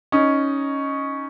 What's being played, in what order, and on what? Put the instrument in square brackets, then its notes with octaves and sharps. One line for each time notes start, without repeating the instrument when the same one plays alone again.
[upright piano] C#4 D#4